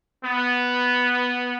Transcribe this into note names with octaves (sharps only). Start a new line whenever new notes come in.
B3